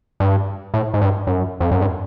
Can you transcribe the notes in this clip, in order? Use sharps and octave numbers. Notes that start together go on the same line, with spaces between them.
G2
A2
G#2
G2
F#2
F2
F#2
G2